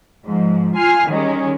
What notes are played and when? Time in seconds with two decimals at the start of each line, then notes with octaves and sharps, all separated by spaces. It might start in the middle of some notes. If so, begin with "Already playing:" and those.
0.25 G#2 F3
0.76 F4 G#5 F6 C7
1.08 D#3 G3 G#3 C#4